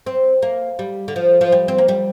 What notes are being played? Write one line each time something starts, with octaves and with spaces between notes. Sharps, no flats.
C4
A#3
G3
D3
F3
F3
G3
C4
A#3
G3